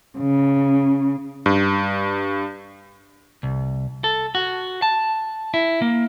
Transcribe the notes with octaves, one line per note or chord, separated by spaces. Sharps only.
C#3
G2
C2
A4
F#4
A5
E4
A#3